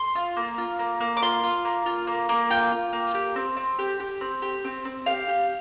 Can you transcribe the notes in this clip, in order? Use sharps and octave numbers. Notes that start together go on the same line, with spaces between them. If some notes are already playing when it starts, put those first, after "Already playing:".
Already playing: C6
F4
A#3
F4
A#3
A#3
D6
F4 C6
F4
A#3
F4
A#3
A#3
F4 G5
F4
A#3
G4
C4
C4
G4
G4
C4
G4
C4
C4
G4 F5
G4